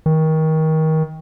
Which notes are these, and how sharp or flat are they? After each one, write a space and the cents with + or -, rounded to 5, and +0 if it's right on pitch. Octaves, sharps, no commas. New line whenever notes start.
D#3 +25